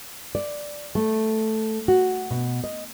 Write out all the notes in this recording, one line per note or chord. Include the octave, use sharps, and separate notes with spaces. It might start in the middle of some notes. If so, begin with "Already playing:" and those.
D5
A3
F#4
B2
D#5